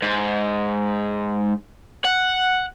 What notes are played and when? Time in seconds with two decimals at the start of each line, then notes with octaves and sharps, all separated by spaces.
0.02 G#2
2.05 F#5